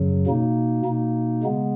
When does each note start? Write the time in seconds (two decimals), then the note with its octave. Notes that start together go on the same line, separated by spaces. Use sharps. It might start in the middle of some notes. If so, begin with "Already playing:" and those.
Already playing: F#2 C#3 F#3
0.27 B2 A#3 D#4
0.85 B2 A#3 D#4
1.43 C#3 G#3 B3